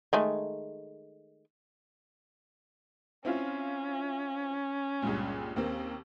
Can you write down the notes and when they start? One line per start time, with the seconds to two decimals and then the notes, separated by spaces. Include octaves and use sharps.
0.13 D#3 G#3 A3
3.25 C4 C#4 E4 F4
5.02 C#2 G2 A#2
5.56 D#2 A#3 C4